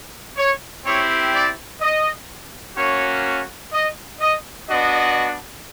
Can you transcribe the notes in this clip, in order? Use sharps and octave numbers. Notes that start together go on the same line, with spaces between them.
C#5
C4 E4 G4 C#5
D5
D#5
A#3 C#4 F#4 C#5
D#5
D#5
B3 D4 F#4 D#5